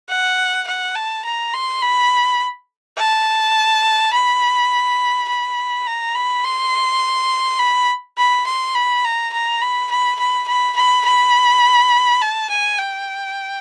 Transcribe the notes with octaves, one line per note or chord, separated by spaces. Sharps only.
F#5
F#5
A5
A#5
C6
B5
A5
B5
B5
A#5
B5
C6
B5
B5
C6
B5
A#5
A#5
B5
B5
B5
B5
B5
B5
A5
G#5
G5